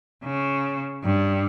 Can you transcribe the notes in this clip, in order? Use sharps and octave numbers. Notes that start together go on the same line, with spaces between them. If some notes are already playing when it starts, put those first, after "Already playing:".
C#3
G2